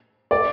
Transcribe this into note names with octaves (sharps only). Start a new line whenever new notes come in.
D5